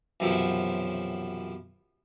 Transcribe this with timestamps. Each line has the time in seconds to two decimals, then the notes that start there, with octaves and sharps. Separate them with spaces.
0.20 B1 F#2 C3 E3 F3